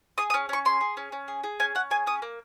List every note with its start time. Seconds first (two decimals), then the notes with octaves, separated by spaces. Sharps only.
0.18 G#4 D#6
0.30 D#6
0.34 C#4
0.49 C#4 C#6
0.65 G#4 C6
0.81 G#4
0.97 C#4
1.12 C#4
1.28 G#4
1.44 G#4
1.60 C#4 G#5
1.75 C#4 F#5
1.91 G#4 G#5
2.07 C#4 D#6
2.22 A#3